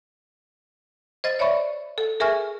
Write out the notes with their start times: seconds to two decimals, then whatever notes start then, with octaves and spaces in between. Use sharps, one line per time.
1.24 C5 D#5 A6
1.39 C#5 D5 E5 B5 C#6
1.98 A4
2.20 G#4 A#4 E5 G#5 C#6 F6